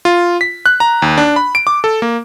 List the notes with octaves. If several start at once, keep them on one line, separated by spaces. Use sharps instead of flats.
F4
B6
F#6
A#5
D#2
D4
B5
D7
D6
A4
A#3